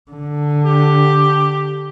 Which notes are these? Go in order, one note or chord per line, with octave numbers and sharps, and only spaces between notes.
D3
G4